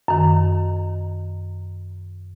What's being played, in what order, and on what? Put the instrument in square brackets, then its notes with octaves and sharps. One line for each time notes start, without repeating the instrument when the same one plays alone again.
[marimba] F#2 D#3